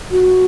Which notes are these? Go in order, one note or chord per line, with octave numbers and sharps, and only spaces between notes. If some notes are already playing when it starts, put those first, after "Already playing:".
F#4